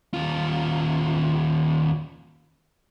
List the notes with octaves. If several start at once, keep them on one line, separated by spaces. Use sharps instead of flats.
D#2 F4